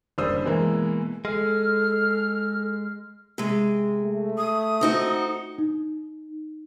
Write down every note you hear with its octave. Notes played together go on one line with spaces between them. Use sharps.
F#1 G3 D4 C5 D#6 E6
B2 E3 G#3 A#3 B3
G#3 A4 F6
C3 G#3
A3
D#6
C4 D#4 F#4
D#4